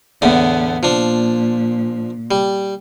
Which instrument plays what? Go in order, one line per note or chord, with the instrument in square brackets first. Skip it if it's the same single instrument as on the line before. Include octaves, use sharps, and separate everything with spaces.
[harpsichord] E2 A2 D3 [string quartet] B3
[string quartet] A#2 [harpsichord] F3 D4
[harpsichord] G3